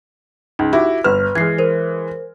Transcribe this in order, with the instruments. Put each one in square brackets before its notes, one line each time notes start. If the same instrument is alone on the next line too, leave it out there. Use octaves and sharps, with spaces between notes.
[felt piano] C#2 [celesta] D#4
[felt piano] E4 F#4 G4
[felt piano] G1 F6 [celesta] B4
[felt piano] E3 G#3 [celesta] G#6 C7
[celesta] A#4 C5